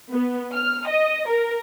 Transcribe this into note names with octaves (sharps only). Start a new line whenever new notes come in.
B3
F6
D#5
A#4